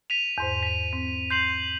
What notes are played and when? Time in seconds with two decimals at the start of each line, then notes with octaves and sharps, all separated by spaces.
0.10 B6 D#7 F7
0.38 E2 G#2 C5
0.63 B6 D#7
0.93 C4
1.30 C6 G6 C7 F#7